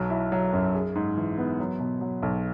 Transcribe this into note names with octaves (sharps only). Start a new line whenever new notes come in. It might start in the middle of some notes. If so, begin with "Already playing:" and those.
Already playing: B1 F#3
E4
F#3
F#2
G#4
G#2
E3
B3
F#3
B2
F#3
B1